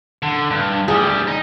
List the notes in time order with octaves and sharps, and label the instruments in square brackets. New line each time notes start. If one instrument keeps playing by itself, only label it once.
[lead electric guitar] D3
G2
[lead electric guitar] D2 G3 [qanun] G#4
[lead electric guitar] D#4